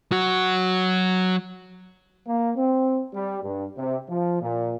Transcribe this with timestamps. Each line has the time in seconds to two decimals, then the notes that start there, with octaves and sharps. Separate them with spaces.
0.12 F#3 F#4
2.27 A#3
2.56 C4
3.13 G3
3.43 G2
3.78 C3
4.09 F3
4.42 A#2